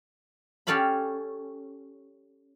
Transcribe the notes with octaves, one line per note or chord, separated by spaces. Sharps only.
C#4 G4 A4 D5 F5 B5